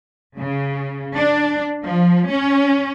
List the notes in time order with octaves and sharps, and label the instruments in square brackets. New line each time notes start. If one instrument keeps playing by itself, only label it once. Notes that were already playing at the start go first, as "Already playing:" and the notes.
[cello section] C#3
D4
F3
C#4